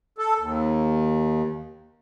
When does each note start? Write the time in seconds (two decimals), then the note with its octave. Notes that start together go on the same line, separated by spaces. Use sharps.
0.18 A4
0.39 D#2